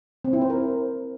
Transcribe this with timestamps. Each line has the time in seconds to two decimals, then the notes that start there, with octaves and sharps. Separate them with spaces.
0.24 C4
0.33 E4
0.41 C5
0.50 A#4